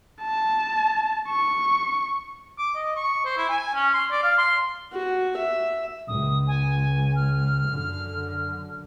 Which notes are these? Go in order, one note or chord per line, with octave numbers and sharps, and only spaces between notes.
A5
C#6
D6
D#5
C#6
C5
E4
G#5
C#4
C6
D5
F5
C6
F#4
E5
C#2 D#6
G#5
F6
F#2 D3